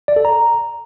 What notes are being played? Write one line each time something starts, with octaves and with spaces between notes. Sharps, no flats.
D5
A4
A#5